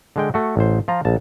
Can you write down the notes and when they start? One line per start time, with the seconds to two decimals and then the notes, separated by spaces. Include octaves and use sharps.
0.16 D3 G#3 G5
0.34 A3 F#4
0.57 A1 C5
0.88 F3 F4 A#5
1.05 A#1 A5